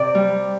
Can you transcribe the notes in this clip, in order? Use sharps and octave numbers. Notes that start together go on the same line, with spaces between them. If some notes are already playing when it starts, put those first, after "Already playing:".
Already playing: C3 D5
G3